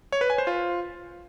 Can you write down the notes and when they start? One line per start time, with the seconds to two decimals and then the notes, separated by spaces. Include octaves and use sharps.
0.12 C#5
0.21 B4
0.30 G#5
0.38 C5
0.47 F4